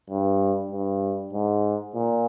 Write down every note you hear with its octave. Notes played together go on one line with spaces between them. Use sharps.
G2
G2
G#2
A#2